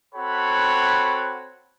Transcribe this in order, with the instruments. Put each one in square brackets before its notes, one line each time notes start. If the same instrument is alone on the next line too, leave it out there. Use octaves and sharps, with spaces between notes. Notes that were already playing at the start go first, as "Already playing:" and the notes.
[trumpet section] C4 F#4 A4 C#5 F#5 B5